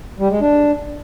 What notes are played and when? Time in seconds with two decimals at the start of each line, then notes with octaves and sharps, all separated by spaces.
0.19 G3
0.30 G#3
0.41 D4